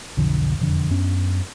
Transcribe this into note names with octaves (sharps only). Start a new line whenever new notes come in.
B1 F2 D3 F3
E1 F2 D3
F#2 B3 C#4 D4